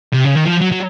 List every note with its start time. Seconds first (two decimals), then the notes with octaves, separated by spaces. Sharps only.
0.13 C3
0.25 C#3
0.35 D#3
0.45 F3
0.61 F#3
0.72 F#3